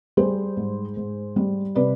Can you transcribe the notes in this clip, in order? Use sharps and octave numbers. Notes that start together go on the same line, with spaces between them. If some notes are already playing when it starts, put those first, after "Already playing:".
G3 G#4 C5
G#2
G#2
G3
C3 B4 D5